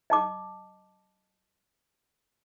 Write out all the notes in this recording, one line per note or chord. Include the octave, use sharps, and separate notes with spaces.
D#5 A5 D6